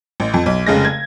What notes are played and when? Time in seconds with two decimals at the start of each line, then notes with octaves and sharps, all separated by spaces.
0.20 A1
0.34 F2
0.46 B1
0.67 F1 C#3 G#3 A#6
0.85 G#6